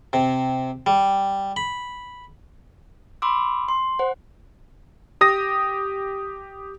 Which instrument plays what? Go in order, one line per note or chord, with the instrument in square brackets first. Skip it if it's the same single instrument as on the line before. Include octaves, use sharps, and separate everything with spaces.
[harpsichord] C3
G3
B5
[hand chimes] B5 C6 D6 E6
C6
C5 F#5
[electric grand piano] G4 D#6 A#6